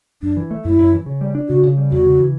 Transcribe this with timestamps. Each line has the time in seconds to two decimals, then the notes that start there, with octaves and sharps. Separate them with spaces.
0.22 F#2 D4
0.37 E3
0.51 A3
0.64 F#2 E4
0.78 F#2
0.93 E3
1.06 C#3
1.21 G3
1.35 D4
1.49 C#3 F#4
1.63 C#3
1.77 G3
1.91 E2 F#4
2.05 C#3
2.19 E3